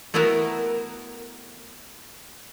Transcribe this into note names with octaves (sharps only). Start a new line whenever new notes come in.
A3 B3 E4 F#4 A#4